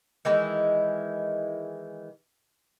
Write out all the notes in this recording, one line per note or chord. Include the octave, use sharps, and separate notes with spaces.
D#3 E3 G#3 E4